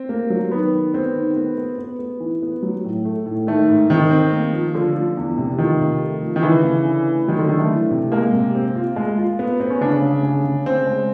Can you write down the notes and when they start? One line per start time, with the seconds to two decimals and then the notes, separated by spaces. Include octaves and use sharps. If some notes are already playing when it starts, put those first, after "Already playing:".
Already playing: C4
0.09 A#3
0.30 F#3
0.51 D#3 B3
0.73 D#3
0.94 B3 C4
1.16 D#3
1.36 B3
1.58 B3
1.78 B3
1.99 B3
2.20 E3
2.42 B3
2.63 F#3
2.84 A2
3.05 A3
3.26 A2
3.47 D#3 A3
3.68 G#2
3.90 D#3 C4
4.11 C4
4.31 A#3
4.53 F3
4.74 D3 F3
4.95 F3
5.17 E2
5.37 C3
5.58 D#3 F3
5.81 C3
6.01 A3
6.22 F3
6.36 D#3
6.43 C#3 E3
6.64 C#3
6.85 D3
7.06 A3
7.28 D#3 F#3
7.39 D3
7.49 D3 D#3
7.60 A3
7.71 E3
7.91 C3
8.12 G#3 A#3
8.33 C3
8.55 C4
8.75 F4
8.96 G#3
9.17 F4
9.39 B3
9.60 B3 C4
9.70 C#4
9.81 C#3 D4
10.02 C#3
10.23 C#3
10.44 C#3
10.66 C#3 C4
10.86 G#3